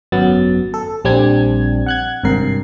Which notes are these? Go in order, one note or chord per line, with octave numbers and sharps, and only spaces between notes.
G#1 F#2 F#3 B3 A6
A4
A#1 G3 C4 D4 G#6
F#5 F#6 G#6
G#1 G2 C3 A#4 C7